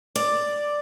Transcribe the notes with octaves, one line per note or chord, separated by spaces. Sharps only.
D5